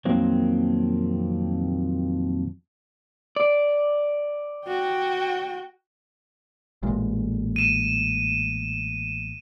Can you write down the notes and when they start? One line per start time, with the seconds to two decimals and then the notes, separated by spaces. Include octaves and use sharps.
0.05 F2 A#2 D#3 F#3 A#3 C4
3.36 D5
4.66 F#4 G5
6.83 A1 A#2 G#3
7.56 D#7 E7